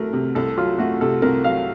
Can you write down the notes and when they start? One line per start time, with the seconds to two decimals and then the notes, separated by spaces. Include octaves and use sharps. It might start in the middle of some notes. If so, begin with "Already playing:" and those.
Already playing: C2 F#3 A3 A#4
0.13 C3
0.35 C2 A4
0.57 F#3 F4
0.78 A3 F#4
1.01 C3 A4
1.22 C2 A#4
1.44 F#3 F5